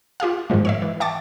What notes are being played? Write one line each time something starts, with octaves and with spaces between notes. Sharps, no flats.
F4 G4 G#4 F5
G#2 B2 D#3 F3 G#3
C#5 D#5 E5
E3
E5 G5 A5 C#6 D6 A6